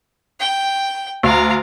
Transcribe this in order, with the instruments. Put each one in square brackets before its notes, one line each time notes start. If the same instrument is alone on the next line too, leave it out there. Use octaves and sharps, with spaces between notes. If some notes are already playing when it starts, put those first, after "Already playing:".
[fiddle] G5
[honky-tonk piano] D2 [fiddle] F5 A#5